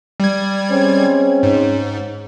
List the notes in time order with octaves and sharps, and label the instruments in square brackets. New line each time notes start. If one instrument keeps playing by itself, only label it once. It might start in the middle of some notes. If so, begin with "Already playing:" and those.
[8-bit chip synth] G3 G#6
[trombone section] G#3 C4 C#4
[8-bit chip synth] G#2